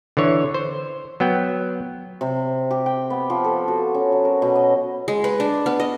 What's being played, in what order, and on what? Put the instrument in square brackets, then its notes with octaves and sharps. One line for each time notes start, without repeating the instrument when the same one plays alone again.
[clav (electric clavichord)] D3 E3 C#5
C5
F#3 B3 G5
[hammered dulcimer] C3
G4
G5
B3
F3
A4
F#4
C#4
F#3
A#4
B2
D#5
[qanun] G#3
B4
D4
B3
D#5